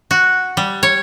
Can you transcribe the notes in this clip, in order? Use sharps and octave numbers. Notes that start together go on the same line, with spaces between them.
F#4
G3
C#5